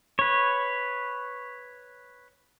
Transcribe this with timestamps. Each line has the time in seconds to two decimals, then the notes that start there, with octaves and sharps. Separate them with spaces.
0.19 B4 C#5